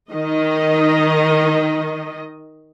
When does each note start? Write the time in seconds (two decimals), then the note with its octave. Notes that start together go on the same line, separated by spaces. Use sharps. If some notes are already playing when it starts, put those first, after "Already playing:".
0.11 D#3 D#5